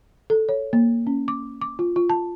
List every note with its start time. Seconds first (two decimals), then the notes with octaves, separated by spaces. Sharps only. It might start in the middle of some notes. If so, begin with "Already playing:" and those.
0.30 A4
0.49 C#5
0.73 A#3
1.07 C#4
1.28 D6
1.61 D6
1.79 F4
1.96 F4
2.10 A5